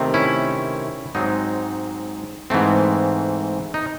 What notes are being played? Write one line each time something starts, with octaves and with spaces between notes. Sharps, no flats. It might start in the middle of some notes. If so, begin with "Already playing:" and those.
Already playing: C3 D#3 A3 C4
C#4 E4
G#2 F#3 C4 D#4
G#2 E3 A3 C4
D#4